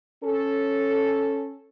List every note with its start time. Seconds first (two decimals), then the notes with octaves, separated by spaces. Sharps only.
0.23 C#4 A4